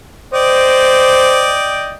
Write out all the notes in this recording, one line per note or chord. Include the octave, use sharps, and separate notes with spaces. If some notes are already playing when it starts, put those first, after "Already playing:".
C5 D5 D#5 G5